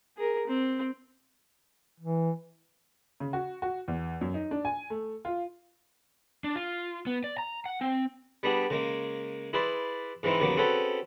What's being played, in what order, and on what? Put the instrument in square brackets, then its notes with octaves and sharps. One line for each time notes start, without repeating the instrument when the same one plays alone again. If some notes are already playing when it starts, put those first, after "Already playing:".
[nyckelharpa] G#4 A#4
C4
[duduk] E3
[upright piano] C#3
F#4
F#4
E2
F#2
D#4
D4
G#5
A3
F4
[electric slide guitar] D4
F4
B3
D5
A#5
F#5
C4
[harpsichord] G3 B3 D4 G#4
C#3 G#3 A#3
E4 G#4 B4 D5 C6
G#2 E3 G#3 C4 D#4 E4
D#2 C#3 F#3 A#3 B3 D6
C4 C#4 F#4 G#4 A4 B4